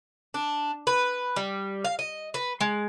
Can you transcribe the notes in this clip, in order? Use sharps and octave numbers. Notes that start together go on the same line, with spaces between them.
D4
B4
G3
F5
D#5
B4
G#3